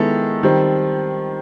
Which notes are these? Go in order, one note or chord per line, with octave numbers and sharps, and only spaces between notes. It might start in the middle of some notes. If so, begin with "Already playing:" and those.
Already playing: D#3 G#3 B3 E4 A4
D#3 G3 C4